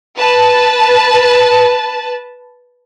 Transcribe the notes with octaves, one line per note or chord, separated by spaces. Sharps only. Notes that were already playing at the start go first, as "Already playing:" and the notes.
B4 A5